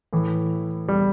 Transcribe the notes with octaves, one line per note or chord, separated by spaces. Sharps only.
A2 E3
G3